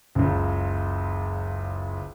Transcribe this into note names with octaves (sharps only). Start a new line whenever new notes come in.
F#1 C#2